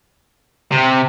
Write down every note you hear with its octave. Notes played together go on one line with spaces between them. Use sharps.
C3